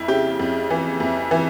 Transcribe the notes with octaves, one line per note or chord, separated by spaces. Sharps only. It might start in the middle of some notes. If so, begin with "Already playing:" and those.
Already playing: F2 E4
C#3 G4
F2
E3
F2
E3